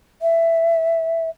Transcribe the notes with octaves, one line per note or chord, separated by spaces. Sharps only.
E5